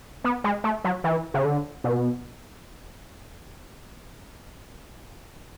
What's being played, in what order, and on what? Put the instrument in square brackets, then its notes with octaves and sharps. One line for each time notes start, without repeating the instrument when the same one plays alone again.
[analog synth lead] B3
G#3
A3
F#3
E3
C#3
D3
B2